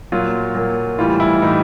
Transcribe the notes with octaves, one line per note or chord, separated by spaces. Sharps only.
A#2 F#3 F4
A#2 F#3
A2 E3 G3 F4
E4
A2 E3 G3 D#4